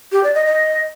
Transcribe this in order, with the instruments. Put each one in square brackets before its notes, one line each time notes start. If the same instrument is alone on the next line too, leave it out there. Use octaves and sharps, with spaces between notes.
[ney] G4
D5
D#5
D#5